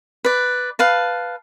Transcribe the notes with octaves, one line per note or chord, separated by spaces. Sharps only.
B4 D5
B4 F5 A5